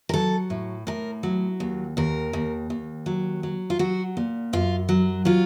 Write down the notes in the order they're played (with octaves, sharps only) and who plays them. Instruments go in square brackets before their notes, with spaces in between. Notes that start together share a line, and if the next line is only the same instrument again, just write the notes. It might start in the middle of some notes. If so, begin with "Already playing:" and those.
[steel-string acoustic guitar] A#4
F#3 A4
A2
A2 A#4
F#3
D#2
D#2 A#4
D#2
D#2
F#3
F#3
F4
F#3 F#4
A#2
F#2 F4
F#3
F#3 F4